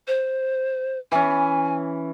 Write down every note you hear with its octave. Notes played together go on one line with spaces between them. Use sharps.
C5
E3 C#4 G#5